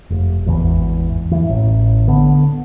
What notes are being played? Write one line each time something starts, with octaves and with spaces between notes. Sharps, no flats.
F1
G#1 E2 E3
E3
A1
D3 B3